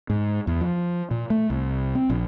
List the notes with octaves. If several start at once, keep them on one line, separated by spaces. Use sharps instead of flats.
G#2
E2
F3
A#2
A3
C2
C4
A#1